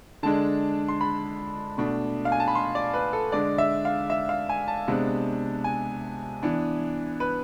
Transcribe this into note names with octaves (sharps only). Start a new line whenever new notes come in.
D3 G#3 D4 A5
C6
B5
B2 A3 D4
F5
G#5
A5
B5
C6
D5
B4
A4
D3 G#3 D4 D5
E5
F5
E5
F5
G#5
A5
C3 G#3 B3 D4
G#5
E3 B3 D4
B4